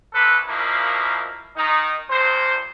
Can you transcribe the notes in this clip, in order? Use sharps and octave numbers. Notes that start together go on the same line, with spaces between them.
C2 A4 B4
B2 F3 A#3 E4 A#4
D#3 D#4
G2 A#2 C5